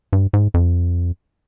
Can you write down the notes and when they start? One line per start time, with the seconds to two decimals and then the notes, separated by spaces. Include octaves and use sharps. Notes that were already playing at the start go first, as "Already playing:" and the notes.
0.13 G2
0.33 G#2
0.54 F2